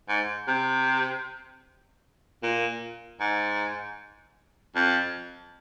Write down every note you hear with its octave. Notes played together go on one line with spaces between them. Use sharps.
G#2
C3
A#2
G#2
F2